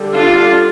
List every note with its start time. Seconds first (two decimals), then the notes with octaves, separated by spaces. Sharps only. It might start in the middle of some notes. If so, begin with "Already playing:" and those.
Already playing: D3 G3
0.13 D4 F4